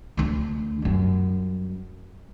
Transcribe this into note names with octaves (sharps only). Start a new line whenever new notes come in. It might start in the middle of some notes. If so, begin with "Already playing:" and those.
D2 D3
F#2 G3